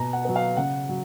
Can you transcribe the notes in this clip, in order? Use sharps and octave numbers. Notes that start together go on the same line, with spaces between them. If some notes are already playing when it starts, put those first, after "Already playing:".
Already playing: B2 A#5
F#5
F#3 B3
F5
C#3 F#5
F#3